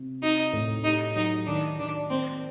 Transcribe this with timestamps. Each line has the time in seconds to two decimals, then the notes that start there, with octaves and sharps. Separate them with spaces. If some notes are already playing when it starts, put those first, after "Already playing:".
Already playing: C3
0.22 D#4 F#4
0.53 A2
0.84 D#4 G4
1.16 F#3 D#4
1.47 D#3 D4
1.79 D#3 D4
2.10 A#3 C4